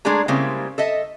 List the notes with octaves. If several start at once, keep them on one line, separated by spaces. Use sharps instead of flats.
G#3 A3 D4 G#4 A#5
C#3 G3 G#3 A#3 C4 E4
A4 D#5 E5